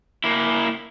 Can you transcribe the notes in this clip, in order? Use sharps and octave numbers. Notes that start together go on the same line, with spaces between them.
A#3 E4